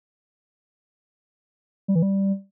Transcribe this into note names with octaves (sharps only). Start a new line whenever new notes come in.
G3
E3
G3